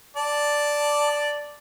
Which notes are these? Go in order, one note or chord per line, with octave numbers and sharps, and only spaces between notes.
D5 A5